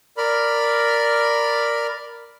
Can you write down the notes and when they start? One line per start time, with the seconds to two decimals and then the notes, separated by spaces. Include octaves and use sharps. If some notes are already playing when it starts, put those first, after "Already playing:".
0.17 A#4 D5 B5 F6